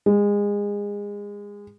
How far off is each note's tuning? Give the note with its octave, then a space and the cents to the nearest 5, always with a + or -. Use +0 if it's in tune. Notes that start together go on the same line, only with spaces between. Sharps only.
G#3 -25